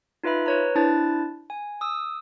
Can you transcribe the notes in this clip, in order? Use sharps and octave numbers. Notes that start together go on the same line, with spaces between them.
D#4 F4 B4 E5 B5
B4 C#5 A#5
D4 E4 C5 A5 F#6 A6
G#5
D#6 E6